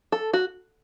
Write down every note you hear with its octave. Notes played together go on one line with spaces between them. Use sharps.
A4
F#4